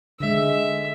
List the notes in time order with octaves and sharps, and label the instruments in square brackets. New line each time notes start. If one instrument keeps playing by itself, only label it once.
[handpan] D3 G#3 [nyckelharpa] E5